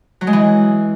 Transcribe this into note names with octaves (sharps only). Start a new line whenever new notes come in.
F#3
G#3
E3